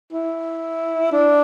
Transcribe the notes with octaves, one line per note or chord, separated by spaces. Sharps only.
E4
D4